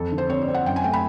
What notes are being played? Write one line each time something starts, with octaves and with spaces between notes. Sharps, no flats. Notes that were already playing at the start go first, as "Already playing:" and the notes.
Already playing: F2 A4
D3
C5
C4 C#5
D5
C4
F#5
F#2 G5
G#5
A3 G5
B5